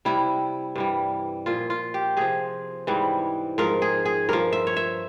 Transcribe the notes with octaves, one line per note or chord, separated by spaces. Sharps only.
C3 G3 E4
G2 E3 G3
A#2 F3 F4
F4
G4
C3 F3 G#4
G#2 E3 G3
G#2 F3 A#4
G#4
G#4
G2 F3 A#4
E5
C#5
E5